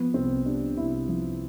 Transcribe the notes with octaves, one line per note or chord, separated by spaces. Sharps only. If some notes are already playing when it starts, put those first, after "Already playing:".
Already playing: F3 B3
C2 C4
C3 D4
C2 E4
F3